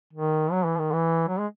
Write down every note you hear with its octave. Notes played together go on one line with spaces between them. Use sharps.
D#3
F#3
E3
D#3
E3
F#3
G#3